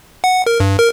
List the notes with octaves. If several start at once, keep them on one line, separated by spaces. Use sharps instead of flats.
F#5
A#4
G2
A#4